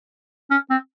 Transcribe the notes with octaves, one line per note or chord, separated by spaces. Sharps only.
C#4
C4